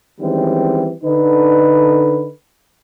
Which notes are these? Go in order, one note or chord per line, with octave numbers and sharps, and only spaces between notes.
D#3 E3 G3 G#3 C4 C#4
D3 D#4 B4